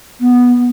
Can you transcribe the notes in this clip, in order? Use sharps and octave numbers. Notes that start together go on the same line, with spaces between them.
B3